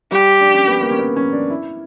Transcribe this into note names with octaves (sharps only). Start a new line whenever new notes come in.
G3 G4
D4
C#4
B3
A#3
C#4
B3
C#4
D4
E4